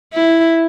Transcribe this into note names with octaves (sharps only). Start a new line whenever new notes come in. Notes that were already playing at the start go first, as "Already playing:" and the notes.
E4